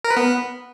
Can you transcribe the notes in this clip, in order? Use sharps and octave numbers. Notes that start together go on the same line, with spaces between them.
A#4
B4
B3